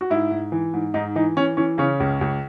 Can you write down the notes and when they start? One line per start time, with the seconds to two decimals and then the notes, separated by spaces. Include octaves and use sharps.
0.01 F#4
0.10 G#2 E4
0.31 G#2
0.52 E3
0.73 G#2
0.94 G#2 D#4
1.16 E3 D#4
1.37 E3 C#4
1.57 E3 C#4
1.78 C#3 C#4
2.00 C#2
2.21 C#2